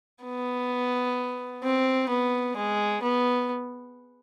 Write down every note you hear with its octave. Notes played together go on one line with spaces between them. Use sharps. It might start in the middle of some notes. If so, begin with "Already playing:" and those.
B3
C4
B3
G#3
B3